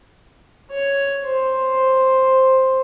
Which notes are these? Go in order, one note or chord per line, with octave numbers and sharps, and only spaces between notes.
C#5
C5